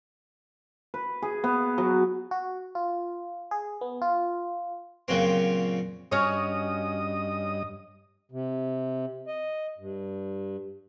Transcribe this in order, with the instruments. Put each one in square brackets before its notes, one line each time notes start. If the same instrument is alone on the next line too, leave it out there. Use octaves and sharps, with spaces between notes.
[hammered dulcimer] B4
G#4
B3
F#3
[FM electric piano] F#4
F4
G#4
B3
F4
[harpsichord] A#2 C#3 F#3 C4
[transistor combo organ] G2 D#5 D#6 [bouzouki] C#4 F#4 C#5
[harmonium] C3
D#5
G2